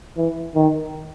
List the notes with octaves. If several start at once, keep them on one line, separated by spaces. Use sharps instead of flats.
E3
D#3